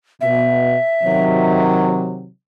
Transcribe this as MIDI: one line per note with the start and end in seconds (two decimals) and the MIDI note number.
0.21 0.75 47
0.21 1.62 76
1.03 2.28 48
1.03 2.28 51
1.03 2.28 54